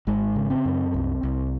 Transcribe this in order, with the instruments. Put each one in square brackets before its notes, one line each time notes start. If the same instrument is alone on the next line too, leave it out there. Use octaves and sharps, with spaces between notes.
[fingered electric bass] G#1 G#3
C#3
C4
F#2
C2
C2